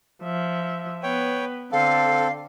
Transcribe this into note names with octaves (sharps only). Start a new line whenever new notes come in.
F3 E5
B3 B4 C#5 G5
D3 C4 A4 F5